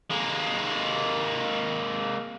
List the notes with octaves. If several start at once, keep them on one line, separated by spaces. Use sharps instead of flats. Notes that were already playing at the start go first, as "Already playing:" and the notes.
G#3 A#3